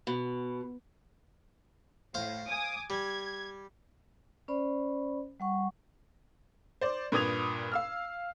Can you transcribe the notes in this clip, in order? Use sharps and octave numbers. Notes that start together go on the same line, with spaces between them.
B2
A2 C5 F5
G#5 D6 D#6
G3 G#6
C#4 C5 D5 B5
G3 F#5 C#6
C5 D5
G2 A#2 B4 D#6 G#6 F7
F5 E6 F6